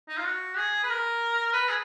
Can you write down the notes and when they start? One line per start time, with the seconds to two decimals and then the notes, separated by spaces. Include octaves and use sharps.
0.09 D#4
0.18 F4
0.25 F#4
0.57 G#4
0.83 B4
0.89 A#4
1.53 B4
1.69 G#4